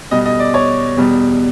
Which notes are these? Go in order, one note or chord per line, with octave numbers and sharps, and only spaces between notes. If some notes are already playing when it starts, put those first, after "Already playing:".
B2 G3 D#5
D#5
D5
C#5
E2 B2 G3